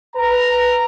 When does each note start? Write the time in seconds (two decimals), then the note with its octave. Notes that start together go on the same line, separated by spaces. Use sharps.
0.16 B4 A#5